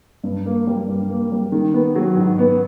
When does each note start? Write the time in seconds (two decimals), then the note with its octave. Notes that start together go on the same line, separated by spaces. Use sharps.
0.24 G2
0.46 A#3
0.67 G3
0.88 G2
1.10 A#3
1.32 G3
1.52 D#3
1.74 B3
1.95 F#3
2.17 G#2
2.39 B3